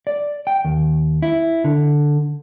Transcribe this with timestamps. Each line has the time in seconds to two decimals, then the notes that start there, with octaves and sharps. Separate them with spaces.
0.07 D5
0.47 G5
0.65 D#2
1.22 E4
1.64 D3